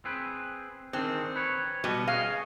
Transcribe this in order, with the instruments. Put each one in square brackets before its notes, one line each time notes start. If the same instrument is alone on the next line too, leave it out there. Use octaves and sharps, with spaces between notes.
[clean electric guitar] C4 G#4 B4
[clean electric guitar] D#3 D4 G#4 [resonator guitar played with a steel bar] C4
[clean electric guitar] B4 C#5
[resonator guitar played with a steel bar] B2 G3
[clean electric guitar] G#4 C#5 D#5 [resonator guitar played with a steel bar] F5